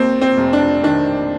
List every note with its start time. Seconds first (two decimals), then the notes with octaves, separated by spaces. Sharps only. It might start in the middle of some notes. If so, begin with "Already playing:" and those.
Already playing: D#2 C4
0.21 C4
0.37 F1
0.53 D4
0.83 D#3 D4